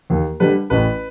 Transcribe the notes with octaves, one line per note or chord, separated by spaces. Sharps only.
D#2
D3 G3 B4
A1 B4